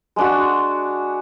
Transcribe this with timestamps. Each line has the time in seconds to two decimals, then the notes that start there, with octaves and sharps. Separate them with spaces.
0.16 G#3 D4 F#4